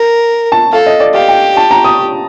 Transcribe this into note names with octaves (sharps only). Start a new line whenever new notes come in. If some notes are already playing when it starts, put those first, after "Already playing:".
Already playing: A#4
A5
A4 F5
D#5
D5
G4 F5
G5
A5
A#5
D#6